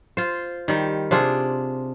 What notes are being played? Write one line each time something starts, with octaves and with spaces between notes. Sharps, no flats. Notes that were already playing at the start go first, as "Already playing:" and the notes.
F4 C5
D#3 G3
C3 D4 F4 G#4